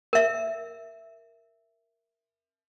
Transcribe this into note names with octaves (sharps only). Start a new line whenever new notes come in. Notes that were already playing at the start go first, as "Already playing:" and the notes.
A#4 E5